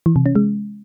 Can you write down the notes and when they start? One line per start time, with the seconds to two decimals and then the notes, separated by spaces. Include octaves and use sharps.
0.06 E3
0.16 C3
0.26 C#4
0.35 G#3